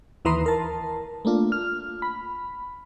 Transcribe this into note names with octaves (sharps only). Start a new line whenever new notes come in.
D#2 E3 B4 A#5 C6 D#6
A#4 A5
A3 A#3 D4 F4
F6
B5